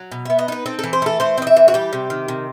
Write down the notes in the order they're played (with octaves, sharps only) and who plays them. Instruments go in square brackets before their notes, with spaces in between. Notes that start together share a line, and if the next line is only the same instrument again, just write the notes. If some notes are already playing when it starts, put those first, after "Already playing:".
Already playing: [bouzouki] F#3
B2
B3 E5
D#5
D#4 B4
C4 A4
E3 A4
C5
A3 A4
E3 C5
C4 D#5
E5
E3
F#4
G3 G4
C3
D#3
C3